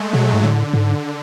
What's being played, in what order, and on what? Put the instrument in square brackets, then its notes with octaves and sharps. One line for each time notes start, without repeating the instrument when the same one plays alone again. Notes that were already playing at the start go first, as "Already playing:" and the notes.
Already playing: [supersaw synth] G#3 A3
[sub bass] B2 [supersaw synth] F#3
[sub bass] G#2
[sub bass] A2 [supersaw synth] D3
[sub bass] G#2